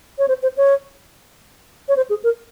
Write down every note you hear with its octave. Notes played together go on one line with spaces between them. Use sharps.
C#5
C5
C5
C#5
C#5
C5
G#4
A#4